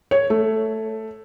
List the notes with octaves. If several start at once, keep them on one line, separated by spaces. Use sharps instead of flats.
C#5
A3